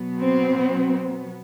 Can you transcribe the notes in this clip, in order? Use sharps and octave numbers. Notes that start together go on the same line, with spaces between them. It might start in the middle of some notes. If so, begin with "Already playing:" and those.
Already playing: B2 F#3 B3
C4